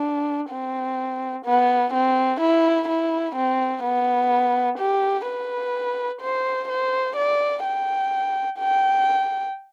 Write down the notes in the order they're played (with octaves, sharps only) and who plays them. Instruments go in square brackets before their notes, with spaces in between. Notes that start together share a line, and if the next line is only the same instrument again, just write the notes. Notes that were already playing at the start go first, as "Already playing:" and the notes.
Already playing: [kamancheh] D4
C4
B3
C4
E4
E4
C4
B3
G4
B4
C5
C5
D5
G5
G5